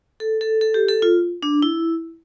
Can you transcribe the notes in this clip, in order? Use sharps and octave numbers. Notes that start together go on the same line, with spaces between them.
A4
A4
A4
G4
A4
F4
D4
E4